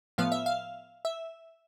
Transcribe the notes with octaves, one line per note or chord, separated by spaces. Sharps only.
A2 F3 B3 F5
E5
F5
E5